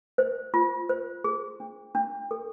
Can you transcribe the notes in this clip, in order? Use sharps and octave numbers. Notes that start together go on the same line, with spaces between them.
C5
F4
C5
G#4
D4
D4
A4